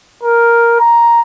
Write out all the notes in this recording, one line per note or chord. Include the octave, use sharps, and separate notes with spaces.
A#4
A#5